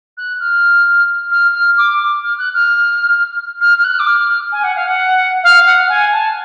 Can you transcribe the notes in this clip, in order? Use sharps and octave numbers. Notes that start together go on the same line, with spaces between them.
F#6
F6
F6
F6
D6
F6
F#6
F6
F6
F6
F#6
D6
F6
G#5
F#5
F5
F#5
F5
F#5
G#5
A5